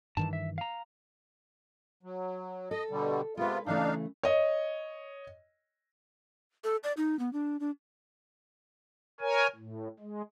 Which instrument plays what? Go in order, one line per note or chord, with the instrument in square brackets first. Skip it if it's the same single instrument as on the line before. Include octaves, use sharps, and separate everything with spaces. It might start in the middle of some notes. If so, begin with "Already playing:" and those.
[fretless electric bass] G2 D#3 E3 [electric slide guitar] A5
[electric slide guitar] E5
F5 A#5
[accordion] F#3
[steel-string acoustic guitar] A4 [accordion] D#5
[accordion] B2 D3 G3
[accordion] C3 B3 F4 [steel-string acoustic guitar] G#3 B4
[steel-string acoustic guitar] C#3 E3 A3 [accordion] D4 D#4 F5
[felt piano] C#5 D#5
[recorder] A4
D5
D#4
B3
D4
D4
[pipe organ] A#4 C#5 G#5
A2
G#3